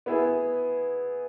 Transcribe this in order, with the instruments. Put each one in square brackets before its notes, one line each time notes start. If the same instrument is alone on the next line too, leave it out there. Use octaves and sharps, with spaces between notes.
[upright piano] B3 E4 G#4